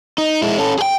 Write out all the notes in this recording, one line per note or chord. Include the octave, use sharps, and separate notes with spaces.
D#4
G#3 E4
C#4 A4
G#4 G5